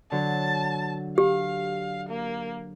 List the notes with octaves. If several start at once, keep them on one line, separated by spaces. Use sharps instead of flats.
D3 F#3 A5
G4 F5
A#3